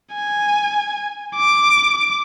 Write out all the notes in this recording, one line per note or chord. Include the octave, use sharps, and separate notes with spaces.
G#5
D6